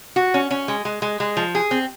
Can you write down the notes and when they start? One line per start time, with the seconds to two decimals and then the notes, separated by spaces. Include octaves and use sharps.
0.16 F#4
0.34 C#4
0.51 C#4
0.68 G#3
0.85 G#3
1.02 G#3
1.20 G#3
1.37 F3
1.55 G#4
1.71 C4